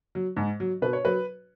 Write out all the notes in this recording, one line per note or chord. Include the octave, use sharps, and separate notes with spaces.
F#3
G#2
F#3
B2 B4
C#5
F#3 B4